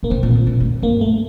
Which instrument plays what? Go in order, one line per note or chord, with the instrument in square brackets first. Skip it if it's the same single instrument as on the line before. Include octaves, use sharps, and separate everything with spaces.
[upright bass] A#2 [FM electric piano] A#3
[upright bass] C3 [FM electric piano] C4
[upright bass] A#2
D3
D#3
D3
C3
D3
[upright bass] G2 [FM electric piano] A#3
[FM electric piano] A3